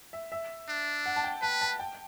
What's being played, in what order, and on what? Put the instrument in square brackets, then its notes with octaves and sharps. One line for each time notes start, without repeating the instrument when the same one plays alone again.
[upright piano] E5
E5
[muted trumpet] D4
[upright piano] F#5
A5
G5
[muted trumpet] B4 [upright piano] A5
[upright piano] A5
G5